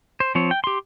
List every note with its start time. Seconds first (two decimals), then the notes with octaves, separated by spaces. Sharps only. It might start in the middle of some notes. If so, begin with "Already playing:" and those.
0.20 C5
0.35 F3 C4 C#5
0.51 G5
0.64 G4 C6